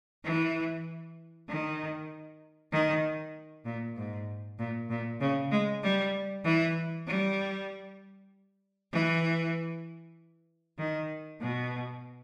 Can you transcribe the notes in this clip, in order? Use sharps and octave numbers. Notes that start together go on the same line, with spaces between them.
E3
D#3
D#3
A#2
G#2
A#2
A#2
C#3
G#3
G3
E3
G3
E3
D#3
B2